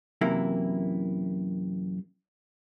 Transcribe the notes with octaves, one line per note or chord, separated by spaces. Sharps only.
F#2 C3 E3 A#3 E4